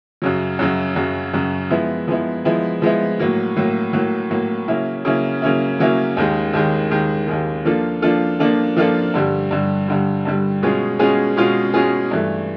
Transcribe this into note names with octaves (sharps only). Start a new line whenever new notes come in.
F#2 C#3 F#3
F#2 C#3 F#3
F#2 C#3 F#3
F#2 C#3 F#3
F3 G#3 B3 E4
F3 G#3 B3 E4
F3 G#3 B3 E4
F3 G#3 B3 E4
A2 F#3 A#3
A2 F#3 A#3
A2 F#3 A#3
A2 F#3 A#3
C#3 F#3 A#3 C#4 E4
C#3 F#3 A#3 C#4 E4
C#3 F#3 A#3 C#4 E4
C#3 F#3 A#3 C#4 E4
D#2 D#3 G#3
D#2 D#3 G#3
D#2 D#3 G#3
D#2 D#3 G#3
F3 A#3 D4 F4 A4
F3 A#3 D4 F4 A4
F3 A#3 D4 F4 A4
F3 A#3 D4 F4 A4
G2 D3 G3
G2 D3 G3
G2 D3 G3
G2 D3 G3
B2 G#3 C#4 F4 G#4
B2 G#3 C#4 F4 G#4
B2 G#3 C#4 F4 G#4
B2 G#3 C#4 F4 G#4
G2 E3 A3